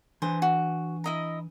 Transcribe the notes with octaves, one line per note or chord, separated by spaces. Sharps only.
E3 D4 C5 G#5
F#4
E4 D#5 A#5